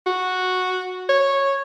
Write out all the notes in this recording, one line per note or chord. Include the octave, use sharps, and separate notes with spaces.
F#4
C#5